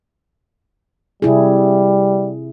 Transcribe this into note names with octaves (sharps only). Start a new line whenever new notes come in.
C3 G3 E4 G#4